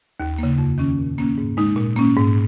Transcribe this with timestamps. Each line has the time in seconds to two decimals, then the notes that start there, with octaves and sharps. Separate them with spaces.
0.20 D#2
0.38 C#3 A#3
0.58 F2
0.78 D#3 C#4
0.98 A#2
1.18 A#3 C#4
1.38 G#2
1.57 G#3 D#4
1.77 A#2
1.96 A#3 C#4
2.17 G#2